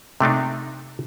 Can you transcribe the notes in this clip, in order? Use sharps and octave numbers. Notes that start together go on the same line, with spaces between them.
C3 A3 D4 D#4